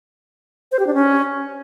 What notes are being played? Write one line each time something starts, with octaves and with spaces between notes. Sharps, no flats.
C5
G4
D4
C#4